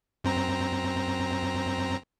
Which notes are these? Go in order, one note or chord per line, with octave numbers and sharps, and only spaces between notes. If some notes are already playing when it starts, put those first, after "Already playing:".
F#2 C4 A#5